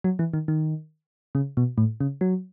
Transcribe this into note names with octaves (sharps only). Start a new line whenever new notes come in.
F#3
E3
D#3
D#3
C#3
B2
A2
C#3
F#3